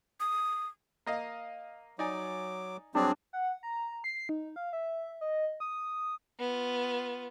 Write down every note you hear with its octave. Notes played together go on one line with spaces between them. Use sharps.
D#6
A#3 D#5 F5
F#3 D#4 D5 G#5 D6
G2 F#3 C4 D4 G#4
F#5
A#5
C7
D#4
F5
E5
D#5
D#6
B3 F4